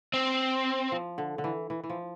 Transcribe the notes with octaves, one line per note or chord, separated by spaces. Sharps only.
C4
F3
D3
D3
E3
E3
E3
F3